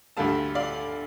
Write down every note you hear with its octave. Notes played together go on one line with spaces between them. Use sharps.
D2 D3 G3 F5 A5
D5 F5